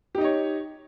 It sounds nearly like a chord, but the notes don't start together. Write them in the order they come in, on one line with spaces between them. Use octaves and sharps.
G4 D#4 D#5 C#5